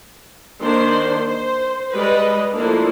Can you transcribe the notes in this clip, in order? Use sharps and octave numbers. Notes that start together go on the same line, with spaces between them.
D#3 A#3 D4 C5 C6
C5
G3 G#3 B4 D#5
F3 A3 A#3 D4 E4